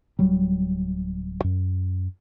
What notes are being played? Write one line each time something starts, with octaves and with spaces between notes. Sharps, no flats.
D1 F#3 G3
F#2